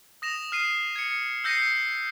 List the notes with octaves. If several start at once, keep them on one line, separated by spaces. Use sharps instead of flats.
D#6 A#6 E7 F7
F6 C7 D#7
G#6 C#7
E6 G6 A#6 C7 C#7 D#7